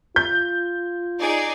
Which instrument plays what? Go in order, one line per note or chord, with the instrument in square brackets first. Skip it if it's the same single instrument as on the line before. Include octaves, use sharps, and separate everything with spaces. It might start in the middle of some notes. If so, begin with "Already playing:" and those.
[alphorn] F4 [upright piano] G6
[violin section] D#4 G#4 D5